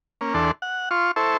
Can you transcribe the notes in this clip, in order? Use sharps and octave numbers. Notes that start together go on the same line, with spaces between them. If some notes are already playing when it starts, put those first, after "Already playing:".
A#3 C#4
E2 D4 A4 C6
F#5
F4 C6 C#6
E4 A4 C5 C#6